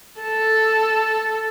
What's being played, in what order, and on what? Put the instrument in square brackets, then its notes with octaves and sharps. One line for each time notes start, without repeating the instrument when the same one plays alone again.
[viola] A4